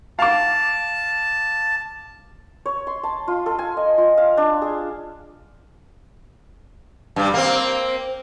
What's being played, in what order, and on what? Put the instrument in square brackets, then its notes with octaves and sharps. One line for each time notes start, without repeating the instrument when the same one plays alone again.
[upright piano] F5 D6 [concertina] A5
[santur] C#5
C6
A5
F4
A4
G#5
D#5
F4
F5
D4
G#4
[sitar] G2 G3
A#3 C4